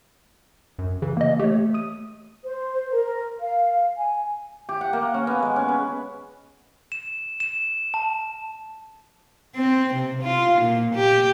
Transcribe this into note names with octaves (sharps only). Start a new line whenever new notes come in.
F#2
C#3 E3
A#3 D#5
A3 G4 C#5
D#6 D#7
C5
A#4
F5
G#5
G4
F#5
A#3
C#4
B3
G#3
C#4
B4
E7
E7
A5
C4
C3
F4
A#2
G4